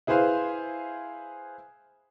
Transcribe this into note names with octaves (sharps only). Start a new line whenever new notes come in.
E4 G#4 B4 C5 F5 G#5